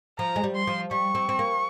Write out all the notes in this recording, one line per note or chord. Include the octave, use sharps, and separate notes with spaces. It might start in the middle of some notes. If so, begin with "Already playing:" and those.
F3 A#5
G#3
G3
C6
F3
G3 C#6
C4
C4
A#3